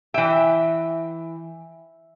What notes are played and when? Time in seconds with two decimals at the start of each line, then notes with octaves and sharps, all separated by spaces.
0.14 E3 E5 G5